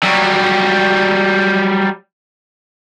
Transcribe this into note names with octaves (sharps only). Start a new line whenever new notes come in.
F#3 G3